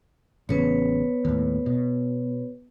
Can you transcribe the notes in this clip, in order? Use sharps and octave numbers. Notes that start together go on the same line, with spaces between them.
A1 C#3 B3 B4 C#5
D#2 A2
B2